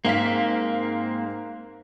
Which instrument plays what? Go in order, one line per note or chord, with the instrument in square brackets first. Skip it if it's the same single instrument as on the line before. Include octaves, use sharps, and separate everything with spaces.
[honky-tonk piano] G#2 F5 B6 [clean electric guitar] A#3 C4